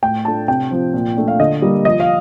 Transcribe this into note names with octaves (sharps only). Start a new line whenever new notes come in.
A2 G5
A3 D4 F4 A5
C3 G5
F3 C4
A#2
A3 D4
F5
D3 D#5
G3 A#3
F3 D#5
F5